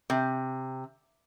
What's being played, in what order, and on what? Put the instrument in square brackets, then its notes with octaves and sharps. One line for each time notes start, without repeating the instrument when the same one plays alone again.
[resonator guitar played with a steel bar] C3